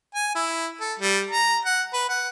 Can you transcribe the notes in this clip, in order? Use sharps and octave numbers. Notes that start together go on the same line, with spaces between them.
G#5
E4
A4
G3
A#5
F#5
B4
F#5